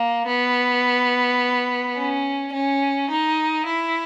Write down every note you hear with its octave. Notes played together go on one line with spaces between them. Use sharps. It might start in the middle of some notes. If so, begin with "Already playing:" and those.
Already playing: A#3
B3
C#4
C#4
D#4
E4